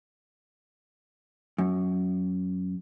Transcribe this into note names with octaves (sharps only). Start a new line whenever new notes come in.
F#2